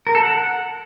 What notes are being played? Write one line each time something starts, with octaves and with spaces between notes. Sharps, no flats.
A#4
A4
F#5